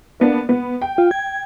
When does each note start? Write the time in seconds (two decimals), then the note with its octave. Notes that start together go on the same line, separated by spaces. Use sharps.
0.20 A#3 B3 D4
0.49 B3
0.82 G5
0.98 F4
1.11 G#6